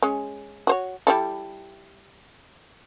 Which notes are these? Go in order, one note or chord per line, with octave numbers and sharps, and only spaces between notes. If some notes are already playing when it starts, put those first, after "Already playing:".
G#3 C#4
F#4 C5 C#5
G3 E4 A4